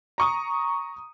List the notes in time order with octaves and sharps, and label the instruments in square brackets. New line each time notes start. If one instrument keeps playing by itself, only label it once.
[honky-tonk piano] A#5 C#6 D#6